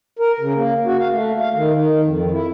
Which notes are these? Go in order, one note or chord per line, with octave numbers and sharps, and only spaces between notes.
A#4
C#3
A#3
F#4
F5
A3
F5
D#3
D#3
F2
E4